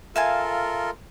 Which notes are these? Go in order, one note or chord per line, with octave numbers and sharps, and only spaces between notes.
F4 A4 A#4 E5 F5 G#5